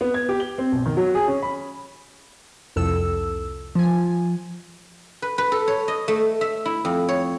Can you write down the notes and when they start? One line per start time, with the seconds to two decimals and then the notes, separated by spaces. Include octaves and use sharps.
0.01 B3
0.14 G#6
0.29 G4
0.40 G7
0.58 C4
0.72 B1
0.86 D#3
0.97 F#3
1.15 G#4
1.28 C#4
1.42 B5
2.76 C2 F2 A4 E6
3.75 F3 G#5
5.22 B4
5.38 B4
5.52 A4
5.68 C#5
5.88 D#5
6.08 A3
6.41 E5
6.65 E4
6.85 F2
7.09 C#5